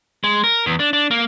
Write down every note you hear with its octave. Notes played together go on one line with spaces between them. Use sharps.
G#3
A#4
E2
D4
D4
A#3